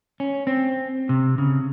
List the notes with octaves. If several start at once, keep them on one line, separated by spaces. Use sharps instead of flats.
C#4
C4
C3
C#3